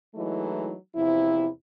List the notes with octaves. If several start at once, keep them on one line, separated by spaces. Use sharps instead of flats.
E3 F#3 G#3 A3 D#4 E4
E2 C3 F3 E4